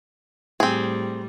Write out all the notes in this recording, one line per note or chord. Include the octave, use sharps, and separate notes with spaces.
A2 G3 C4 G#4